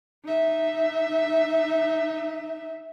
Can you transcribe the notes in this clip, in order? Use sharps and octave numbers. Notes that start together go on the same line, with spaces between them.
D#4 E5